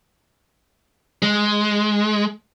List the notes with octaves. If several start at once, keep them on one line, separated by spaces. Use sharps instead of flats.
G#3